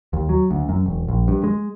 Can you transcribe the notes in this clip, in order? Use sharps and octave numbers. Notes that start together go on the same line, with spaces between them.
D#2
F#3
D2
F#2
E1
A#1
G2
G#3